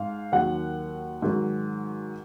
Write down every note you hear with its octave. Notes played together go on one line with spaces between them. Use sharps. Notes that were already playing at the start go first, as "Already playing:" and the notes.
Already playing: G#2 F5
D#2 D#3 F#3 F#5
G#2 D#3 F#3